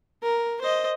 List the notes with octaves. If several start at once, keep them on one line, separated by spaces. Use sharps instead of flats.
A#4
C5 D#5